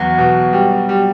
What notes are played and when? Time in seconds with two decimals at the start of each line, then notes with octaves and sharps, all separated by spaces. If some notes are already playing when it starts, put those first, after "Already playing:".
Already playing: E2 F#3 B3
0.18 B2
0.53 G3
0.89 G3